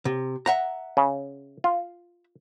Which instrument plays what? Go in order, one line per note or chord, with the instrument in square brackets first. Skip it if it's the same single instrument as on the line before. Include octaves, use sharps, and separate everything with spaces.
[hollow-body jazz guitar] C3
E5 F#5 A#5
[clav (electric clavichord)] C#3
F4